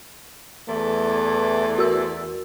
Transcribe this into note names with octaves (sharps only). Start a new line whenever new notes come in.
E2 E3 A3 D5
F#4 A#4 E6